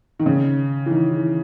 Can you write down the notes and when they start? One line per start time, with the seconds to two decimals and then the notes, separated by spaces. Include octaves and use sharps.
0.19 D#3
0.26 C#3
0.86 E3
0.91 D#3
1.12 E3